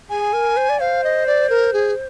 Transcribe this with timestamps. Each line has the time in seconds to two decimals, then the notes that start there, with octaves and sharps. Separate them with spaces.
0.10 G#4 G#5
0.33 A#4
0.57 C5
0.69 D5
0.80 C5 F5
1.04 D#5
1.27 D5
1.50 A#4
1.73 G#4